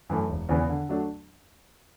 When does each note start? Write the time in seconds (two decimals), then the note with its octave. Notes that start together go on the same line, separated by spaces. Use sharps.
0.10 F#2 E3 A3
0.30 E1
0.49 E2 C#3 E3 B3
0.69 D3
0.89 F#3 A3 D4